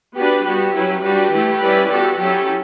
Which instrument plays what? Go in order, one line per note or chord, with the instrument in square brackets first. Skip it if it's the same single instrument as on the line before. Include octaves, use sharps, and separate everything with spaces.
[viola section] B3 D4 F#4 B4 [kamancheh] G4
[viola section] G3 B3 F#4 [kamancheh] G4
[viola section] F#3 C#4 E4 B4
[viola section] G3 D4 F#4 B4 [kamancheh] G4
[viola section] E3 A3 E4
G3 C#4 E4 B4 D5
[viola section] E3 B3 F#4 A4 [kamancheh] G4
[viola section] F#3 C#4 E4 A4 [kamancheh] G4